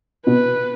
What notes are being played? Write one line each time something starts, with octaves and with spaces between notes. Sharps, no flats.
B2 B4